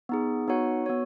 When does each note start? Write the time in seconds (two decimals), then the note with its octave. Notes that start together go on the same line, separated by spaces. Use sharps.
0.09 B3 D#4 G#4
0.48 B3 D#4 F#4 C#5 F#5
0.86 B3 F#4 C#5